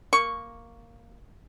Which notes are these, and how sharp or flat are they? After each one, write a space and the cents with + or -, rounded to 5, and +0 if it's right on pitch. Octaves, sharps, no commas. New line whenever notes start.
A#3 +0 C#6 +0